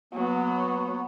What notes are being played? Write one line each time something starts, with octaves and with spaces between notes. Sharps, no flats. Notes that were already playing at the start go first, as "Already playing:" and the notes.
F#3 A#3 B3